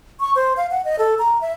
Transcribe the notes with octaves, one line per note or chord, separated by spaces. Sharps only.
C#6
C5
F5
F#5
D#5
A4
A#5
E5